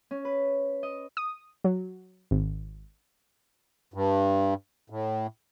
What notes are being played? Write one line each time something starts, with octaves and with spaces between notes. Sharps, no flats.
C#4
B4
D#5
D#6
F#3
G#1
G2
A2